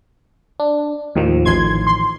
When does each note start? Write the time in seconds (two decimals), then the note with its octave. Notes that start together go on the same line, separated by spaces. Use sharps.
0.60 D4
1.15 D#2 A2 D#3 F3
1.45 A1 C6 G#6
1.87 C6